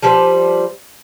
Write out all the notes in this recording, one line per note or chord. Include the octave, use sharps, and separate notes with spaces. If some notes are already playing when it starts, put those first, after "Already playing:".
F3 G3 B4 C5